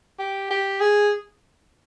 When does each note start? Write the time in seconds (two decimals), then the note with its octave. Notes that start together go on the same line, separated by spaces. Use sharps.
0.19 G4
0.50 G4
0.80 G#4